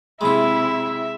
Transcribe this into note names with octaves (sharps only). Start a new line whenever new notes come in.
C3 G#3 E4 F4 E5 B5